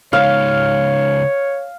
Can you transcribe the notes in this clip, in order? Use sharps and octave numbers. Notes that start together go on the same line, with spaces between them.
C#3 G#3 D#4 C#5 F5